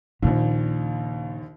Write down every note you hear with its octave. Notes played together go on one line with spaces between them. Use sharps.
A#1 D#2 A#2 C#3